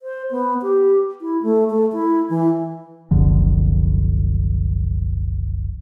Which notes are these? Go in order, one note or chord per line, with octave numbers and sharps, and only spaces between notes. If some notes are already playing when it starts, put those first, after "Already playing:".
C5
B3
G4
E4
A3
A3
E4
E3
F#1 C2 D3 F3